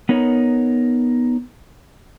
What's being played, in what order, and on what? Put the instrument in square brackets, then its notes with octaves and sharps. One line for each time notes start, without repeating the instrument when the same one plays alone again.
[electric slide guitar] B3 D#4 A#4 C#5